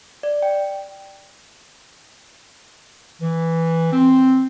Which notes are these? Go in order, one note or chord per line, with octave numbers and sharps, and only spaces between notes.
D5
G5
E3
C4